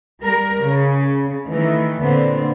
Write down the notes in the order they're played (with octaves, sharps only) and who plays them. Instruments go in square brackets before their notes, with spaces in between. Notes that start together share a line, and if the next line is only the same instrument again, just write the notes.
[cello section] G3 A#4
C#3
D#3 E3 A3
A#2 D3 B3 C4